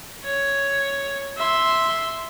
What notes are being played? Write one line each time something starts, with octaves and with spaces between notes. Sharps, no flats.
C#5
E5 C6